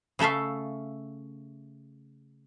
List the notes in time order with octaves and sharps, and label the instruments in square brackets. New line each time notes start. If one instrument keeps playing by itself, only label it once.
[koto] C#3 A3 A4 E5 F5